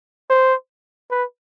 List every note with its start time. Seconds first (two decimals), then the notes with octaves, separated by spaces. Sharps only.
0.30 C5
1.11 B4